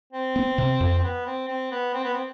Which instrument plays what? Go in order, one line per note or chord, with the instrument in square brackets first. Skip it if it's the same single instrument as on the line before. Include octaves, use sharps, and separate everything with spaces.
[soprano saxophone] C4
[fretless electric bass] B3
C3
F2
[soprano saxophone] C4
B3
C4
C4
B3
C4
B3
C4